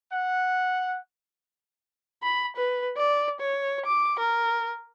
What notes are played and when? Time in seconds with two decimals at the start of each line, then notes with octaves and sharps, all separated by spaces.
0.11 F#5
2.23 B5
2.56 B4
2.97 D5
3.40 C#5
3.86 D6
4.19 A#4